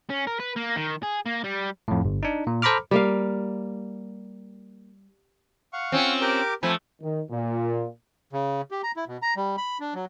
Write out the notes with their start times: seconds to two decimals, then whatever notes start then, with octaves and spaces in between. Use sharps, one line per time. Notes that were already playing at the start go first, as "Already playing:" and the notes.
0.10 C#4
0.27 A#4
0.40 B4
0.57 A#3
0.76 D#3
1.03 G#4
1.26 A#3
1.44 G3
1.88 F2 A2
2.05 G1
2.23 D4 D#4
2.47 A#2
2.62 A4 C5 A#5 B5 D6 F6
2.91 G3 A#3 F5
5.73 F5 F#5 C#6
5.92 C4 C#4 F4
6.21 G4 A#4 D6
6.63 F3 A3 C4 G#5 B5
7.02 D#3
7.31 A#2
8.33 C#3
8.71 G4
8.84 A#5
8.96 E4
9.08 B2
9.22 A#5
9.36 G3
9.58 B5
9.80 D4
9.94 F#3